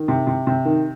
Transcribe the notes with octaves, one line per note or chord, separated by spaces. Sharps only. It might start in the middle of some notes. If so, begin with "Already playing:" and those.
Already playing: D#3
C3
C3
C3
D#3